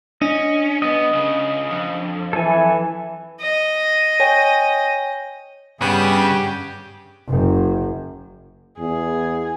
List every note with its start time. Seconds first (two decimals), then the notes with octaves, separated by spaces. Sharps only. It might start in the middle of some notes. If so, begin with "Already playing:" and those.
0.22 C#4 D4 D#5
0.82 B1 B3 D#5
1.13 C#2 C#3
1.71 F2
2.33 E3 A4 G#5
3.40 D#5
4.20 C#5 G5 G#5
5.81 G2 C#3 B3 C#4 G4
7.28 F#1 F#2
8.79 E2 G#4